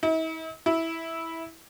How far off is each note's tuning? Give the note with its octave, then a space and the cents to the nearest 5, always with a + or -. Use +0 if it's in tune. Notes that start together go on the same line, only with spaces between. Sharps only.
E4 -45
E4 -10